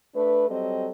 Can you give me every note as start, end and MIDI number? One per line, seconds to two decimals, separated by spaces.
0.15 0.47 57
0.15 0.47 62
0.15 0.47 71
0.49 0.89 54
0.49 0.89 55
0.49 0.89 60
0.49 0.89 69
0.49 0.89 75